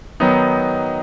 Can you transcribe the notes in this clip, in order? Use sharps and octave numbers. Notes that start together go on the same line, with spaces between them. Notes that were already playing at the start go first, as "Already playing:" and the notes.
D#3 F#3 B3 D#4